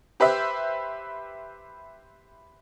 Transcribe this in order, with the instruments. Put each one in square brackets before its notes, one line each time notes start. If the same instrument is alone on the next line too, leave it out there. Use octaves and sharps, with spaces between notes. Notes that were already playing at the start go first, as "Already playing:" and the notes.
[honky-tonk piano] G4 B4 C5 E5